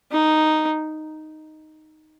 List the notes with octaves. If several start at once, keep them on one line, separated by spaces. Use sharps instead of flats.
D#4